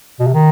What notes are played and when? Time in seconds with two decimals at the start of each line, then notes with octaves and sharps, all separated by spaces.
0.20 B2
0.27 C3
0.34 D#3